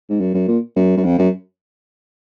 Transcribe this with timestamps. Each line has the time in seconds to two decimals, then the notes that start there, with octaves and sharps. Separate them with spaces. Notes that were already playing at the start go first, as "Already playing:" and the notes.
0.09 G#2
0.20 F#2
0.34 F#2
0.48 A#2
0.76 F#2
0.97 F#2
1.04 F2
1.18 F#2